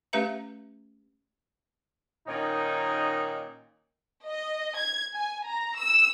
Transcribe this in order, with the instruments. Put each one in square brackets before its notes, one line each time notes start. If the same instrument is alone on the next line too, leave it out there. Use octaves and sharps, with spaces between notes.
[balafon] A3 C#4 G4 B4 E5 A#5
[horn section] A#2 D#3 C#4 D#4
[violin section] D#5
G#6
G#5
A#5
E6